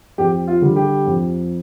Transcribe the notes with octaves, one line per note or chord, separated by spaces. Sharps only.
F2 G4
F4
D3 G3
G4
F2